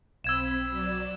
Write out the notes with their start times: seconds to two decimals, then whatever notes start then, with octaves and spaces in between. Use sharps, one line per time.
0.24 B1 C4 B5 E6 G#6 E7
0.70 F#3 D5